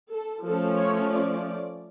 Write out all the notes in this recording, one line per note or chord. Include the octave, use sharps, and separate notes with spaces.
A4
F3 A3 C#4 A4
C#5
D5